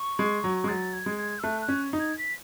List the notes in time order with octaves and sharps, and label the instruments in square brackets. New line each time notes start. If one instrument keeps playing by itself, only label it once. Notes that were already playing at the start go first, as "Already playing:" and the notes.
Already playing: [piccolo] C#6
[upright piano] G#3
F#3
G#3
[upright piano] F#3 [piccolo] A6
[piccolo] G#6
[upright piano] G#3
[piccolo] G#6
E6
[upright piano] A3 [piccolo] F#6
[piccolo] F#6
[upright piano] C#4
D#4
[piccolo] G#6
B6